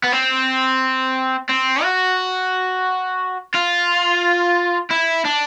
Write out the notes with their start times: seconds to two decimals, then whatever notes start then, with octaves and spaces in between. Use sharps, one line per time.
0.04 B3
0.12 C4
1.49 C4
1.83 F#4
3.54 F4
4.91 E4
5.25 D4